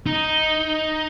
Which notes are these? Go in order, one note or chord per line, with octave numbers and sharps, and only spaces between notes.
D#4